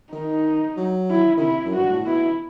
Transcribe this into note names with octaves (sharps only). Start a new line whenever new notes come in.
D#3 D#4
F#3
E4
D#3
C3 E4
F#2
G2 F#4
A2
B2 E4